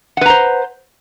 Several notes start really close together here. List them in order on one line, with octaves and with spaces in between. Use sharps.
F#5 B4 A#5 C5